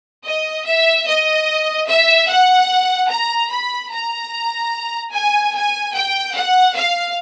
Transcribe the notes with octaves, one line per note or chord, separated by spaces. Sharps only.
D#5
E5
D#5
E5
F#5
A#5
B5
A#5
G#5
G#5
G5
F#5
F5